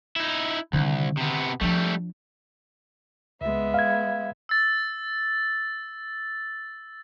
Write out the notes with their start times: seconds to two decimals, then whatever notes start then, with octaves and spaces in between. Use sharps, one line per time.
0.16 D#4 E4
0.73 C2 D3 D#3
1.17 C3 B3
1.61 F3 G3 A3 D4
3.41 C#2 G#3 B3 E5
3.74 F5 G#6
4.49 E6 A6